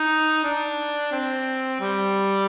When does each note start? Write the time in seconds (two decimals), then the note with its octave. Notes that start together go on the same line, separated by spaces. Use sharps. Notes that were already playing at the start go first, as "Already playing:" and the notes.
Already playing: D#4
0.44 D4
1.12 C4
1.80 G3